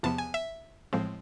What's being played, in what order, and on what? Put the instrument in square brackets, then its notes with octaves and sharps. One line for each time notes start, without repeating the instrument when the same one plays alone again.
[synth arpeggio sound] E2 C3 F3 B3 A5
G#5
E5
A1 A2 F3 G#3 C4